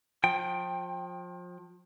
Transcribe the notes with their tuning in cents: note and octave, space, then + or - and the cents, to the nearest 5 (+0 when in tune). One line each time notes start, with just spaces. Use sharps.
F3 +30 G5 +0